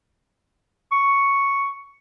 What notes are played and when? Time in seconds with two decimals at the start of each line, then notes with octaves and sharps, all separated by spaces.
0.92 C#6